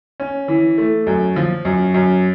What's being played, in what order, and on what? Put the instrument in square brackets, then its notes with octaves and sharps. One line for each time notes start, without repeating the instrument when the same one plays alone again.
[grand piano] C#4
E3
A3
F#2
F3
F#2
F#2